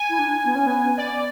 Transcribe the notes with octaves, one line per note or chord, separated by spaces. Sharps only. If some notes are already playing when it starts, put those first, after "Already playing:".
Already playing: G#5
E4
D4
B3
C#4
B3
D5